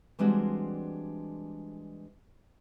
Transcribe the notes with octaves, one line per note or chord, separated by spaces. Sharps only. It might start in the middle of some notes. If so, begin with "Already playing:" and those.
E3 G3 G#3 C4 D4 F#4